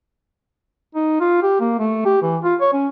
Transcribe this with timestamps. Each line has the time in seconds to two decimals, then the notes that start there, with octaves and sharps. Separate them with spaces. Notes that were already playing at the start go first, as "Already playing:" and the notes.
0.95 D#4
1.20 F4
1.43 G4
1.60 A#3
1.79 A3
2.05 G4
2.22 E3
2.44 F4
2.61 C#5
2.73 C#4